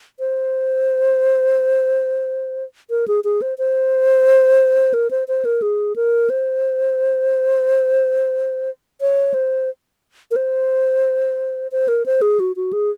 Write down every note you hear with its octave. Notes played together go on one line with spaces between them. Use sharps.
C5
A#4
G#4
G#4
C5
C5
A#4
C5
C5
A#4
G#4
A#4
C5
C#5
C5
A#4
C5
C5
A#4
C5
G#4
F#4
F#4
G#4